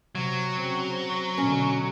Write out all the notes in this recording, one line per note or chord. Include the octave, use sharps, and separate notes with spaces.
C3 F#3
C#3 C4
B2 D3 C#4